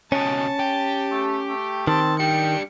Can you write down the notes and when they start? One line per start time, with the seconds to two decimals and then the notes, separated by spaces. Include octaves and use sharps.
0.12 C#2 B2 C#4 A5
0.60 G4
1.11 A3
1.48 A3
1.87 D#3 C4 A5
2.20 G3 D4 G5 C#7